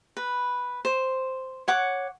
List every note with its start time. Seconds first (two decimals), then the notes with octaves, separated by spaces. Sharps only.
0.17 B4
0.85 C5
1.68 C#5 F#5 D6